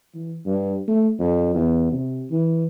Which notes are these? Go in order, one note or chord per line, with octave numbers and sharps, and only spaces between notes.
E3
G2
A3
F2
E2
C3
E3